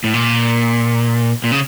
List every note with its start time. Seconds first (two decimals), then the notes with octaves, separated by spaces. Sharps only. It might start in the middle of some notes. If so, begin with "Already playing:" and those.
0.04 A2
0.14 A#2
1.44 A#2
1.52 C#3